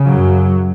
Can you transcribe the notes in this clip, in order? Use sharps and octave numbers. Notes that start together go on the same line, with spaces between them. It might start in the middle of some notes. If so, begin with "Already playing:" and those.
Already playing: C#3
F#2 F#3